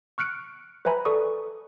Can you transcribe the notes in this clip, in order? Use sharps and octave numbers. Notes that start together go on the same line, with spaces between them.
C#6 F6 F#6 C#7 D7
B4 C5 E5 G#5 A#5 B5
A4 D5 C#6 D#6